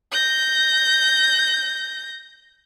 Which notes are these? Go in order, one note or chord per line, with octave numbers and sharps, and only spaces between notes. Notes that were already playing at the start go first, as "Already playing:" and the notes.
G6 A#6